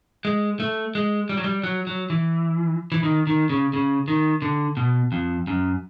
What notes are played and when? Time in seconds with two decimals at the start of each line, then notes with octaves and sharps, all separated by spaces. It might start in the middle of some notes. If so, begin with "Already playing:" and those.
0.25 G#3
0.60 A3
0.95 G#3
1.29 G3
1.37 F#3
1.44 G3
1.64 F#3
1.87 F#3
2.10 E3
2.92 E3
3.03 D#3
3.27 D#3
3.50 C#3
3.73 C#3
4.08 D#3
4.42 D3
4.77 B2
5.12 F2
5.47 F#2